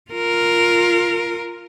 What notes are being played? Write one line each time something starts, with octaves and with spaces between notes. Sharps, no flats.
F4 A#4